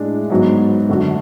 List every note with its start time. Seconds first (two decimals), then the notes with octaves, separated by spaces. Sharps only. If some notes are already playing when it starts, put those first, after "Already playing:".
Already playing: A2 G#3 D4
0.30 G#2 F#3 B3 F#4
0.89 F#2 D3 A3 D4 F#4